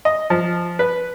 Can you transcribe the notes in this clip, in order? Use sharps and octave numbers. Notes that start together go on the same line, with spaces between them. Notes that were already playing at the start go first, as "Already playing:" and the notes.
D#5
F3
B4